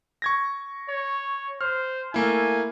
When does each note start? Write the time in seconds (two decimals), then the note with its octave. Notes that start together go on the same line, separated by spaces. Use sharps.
0.22 C#6 G#6 A#6
0.90 C#5
1.61 C5 F6
2.14 A3 A#3 E4 G#5